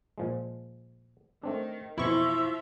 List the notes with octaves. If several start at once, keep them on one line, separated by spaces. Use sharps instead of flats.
A#2 F3 G#3
D#3 A3 C4 D4
F2 B2 E3 F3 E4 E5 C#6